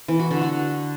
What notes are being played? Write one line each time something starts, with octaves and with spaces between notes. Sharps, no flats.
E3
F#4
D3
F#4